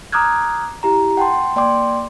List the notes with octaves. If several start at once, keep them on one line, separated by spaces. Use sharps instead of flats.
A#5 D6 D#6 F6 F#6 G#6
E4 G4 A#5
F#5 G5 A5 C6
A#3 D5 G5 C6 D6